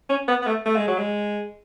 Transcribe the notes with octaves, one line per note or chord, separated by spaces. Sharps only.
C#4
B3
B3
A3
A3
G#3
F#3
G#3